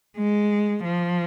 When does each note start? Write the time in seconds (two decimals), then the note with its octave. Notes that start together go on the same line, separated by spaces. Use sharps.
0.18 G#3
0.85 F3